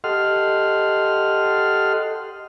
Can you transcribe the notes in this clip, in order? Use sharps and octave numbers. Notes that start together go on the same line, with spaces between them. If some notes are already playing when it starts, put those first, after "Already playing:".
G4 A4 D#5 F#5 C6 F6